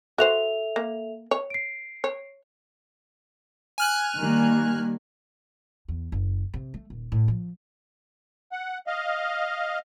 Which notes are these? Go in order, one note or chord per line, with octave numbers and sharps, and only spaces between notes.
F#4 A4 C5 E5 F7
A#3
C#5
C7 D7
C#5
G#5 F6 F#6
D#3 G3 A#3
E2
F#1
C3
A3
D#1
A2
F3
F#5
D#5 F5